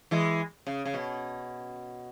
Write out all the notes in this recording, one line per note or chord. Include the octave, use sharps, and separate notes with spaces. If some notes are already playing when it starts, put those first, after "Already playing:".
E3 G#3
C#3
C#3
B2